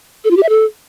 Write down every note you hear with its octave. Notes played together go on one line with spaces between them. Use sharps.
A4
F4
G4
E5
A4